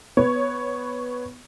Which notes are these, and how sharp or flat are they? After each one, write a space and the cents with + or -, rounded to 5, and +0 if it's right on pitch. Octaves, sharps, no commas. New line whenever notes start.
B3 +0 C#5 +0